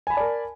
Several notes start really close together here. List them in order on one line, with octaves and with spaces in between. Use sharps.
G#5 B5 A5 D5 A#4